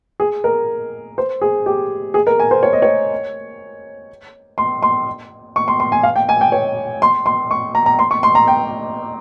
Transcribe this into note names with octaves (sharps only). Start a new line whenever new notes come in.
G#4
A#4
C5
G#4
G4
G#4
A#4
G#5
C5
C#5
D#5
C#5
C6
C6
C#6
C6
C6
G#5
F5
G5
G#5
G5
C#5
C6
C6
C#6
A#5
A#5
C6
C#6
C6
A#5
G5